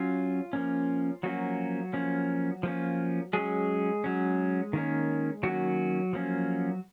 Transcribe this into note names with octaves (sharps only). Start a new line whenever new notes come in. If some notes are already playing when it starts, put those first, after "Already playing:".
Already playing: F#3 C#4 F4
F3 A#3 C#4
F3 F#3 A#3 C#4 F#4
F3 A#3 C#4
F3 A#3 C#4
F#3 G#3 C#4 G#4
F#3 C#4
D#3 A#3 C#4
D#3 F#3 A#3 C#4 F#4
F3 A#3 C#4